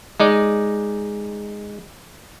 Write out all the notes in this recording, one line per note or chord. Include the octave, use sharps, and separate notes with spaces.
G#3 D#4 D5